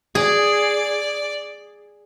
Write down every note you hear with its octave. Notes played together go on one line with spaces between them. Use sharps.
G#4 D5